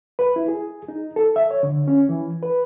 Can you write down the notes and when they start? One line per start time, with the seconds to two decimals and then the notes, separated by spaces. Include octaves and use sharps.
0.19 B4
0.36 E4
0.48 G#4
0.88 D#4
1.16 A4
1.36 E5
1.51 C#5
1.63 D3
1.88 C#4
2.09 E3
2.43 B4